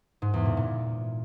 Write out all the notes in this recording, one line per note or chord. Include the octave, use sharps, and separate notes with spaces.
G#2
E2
A#2
A#2